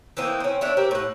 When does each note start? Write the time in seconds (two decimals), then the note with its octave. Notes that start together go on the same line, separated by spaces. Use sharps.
0.17 E3 A#3 C4 D#4
0.40 C4 C#4
0.61 D4 E4 C#5
0.77 C4 G4 A#4
0.91 A2 F#5